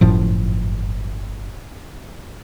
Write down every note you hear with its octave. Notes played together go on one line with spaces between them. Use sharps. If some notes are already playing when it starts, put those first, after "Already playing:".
G1 F#2 A2 F3